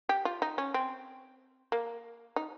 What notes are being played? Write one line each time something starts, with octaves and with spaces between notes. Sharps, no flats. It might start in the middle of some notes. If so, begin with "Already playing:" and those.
G4
F4
D#4
C#4
C4
A#3
D#4